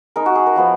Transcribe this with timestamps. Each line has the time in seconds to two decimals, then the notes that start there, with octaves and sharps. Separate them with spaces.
0.16 G#3 D#4 A#4
0.26 F#4
0.35 G#4
0.47 A#4
0.56 F3 B3 D#4